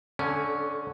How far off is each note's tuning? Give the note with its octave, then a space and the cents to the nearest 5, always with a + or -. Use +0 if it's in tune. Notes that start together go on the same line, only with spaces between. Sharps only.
D3 +0 A3 -30 C#4 +0